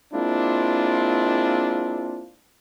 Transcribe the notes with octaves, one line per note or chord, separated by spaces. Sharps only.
G#3 A#3 C4 D4 E4 F4